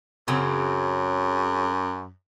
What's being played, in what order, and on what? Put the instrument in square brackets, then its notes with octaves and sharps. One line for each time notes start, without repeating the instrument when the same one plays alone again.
[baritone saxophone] F#2 [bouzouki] C#3 F#3 C4